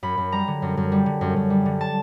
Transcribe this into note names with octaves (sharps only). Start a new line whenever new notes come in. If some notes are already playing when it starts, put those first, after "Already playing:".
F#2 B5
F#2
G3 A#5
D3
F#2
F#2
G3
D3
F#2
F#2
G3
D3
A5